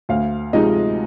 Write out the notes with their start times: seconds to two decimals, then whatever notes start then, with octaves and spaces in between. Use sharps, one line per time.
0.09 D2 F5
0.53 C3 F3 G#3 D#4 D#5